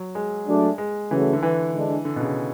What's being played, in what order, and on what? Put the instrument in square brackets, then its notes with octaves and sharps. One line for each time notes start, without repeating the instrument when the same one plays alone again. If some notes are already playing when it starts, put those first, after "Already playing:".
Already playing: [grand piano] F#3
G#3
[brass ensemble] F#3 A3 D4
[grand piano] G#3
[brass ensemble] C#3 F#3 A3 [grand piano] E3
[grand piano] D3
E3
[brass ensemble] D3 G#3 D4
[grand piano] D3
B2
C#3